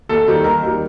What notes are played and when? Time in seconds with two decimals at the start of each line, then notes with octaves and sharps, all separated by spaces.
0.09 D#2 A4
0.27 D#3 G3
0.44 D#2 A#4
0.63 D#3 G3